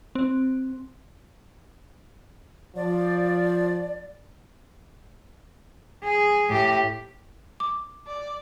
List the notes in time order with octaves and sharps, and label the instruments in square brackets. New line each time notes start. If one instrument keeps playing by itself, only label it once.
[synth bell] C4
[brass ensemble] F3 [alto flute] D5
[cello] G#4
A2 G4
[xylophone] D6
[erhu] D5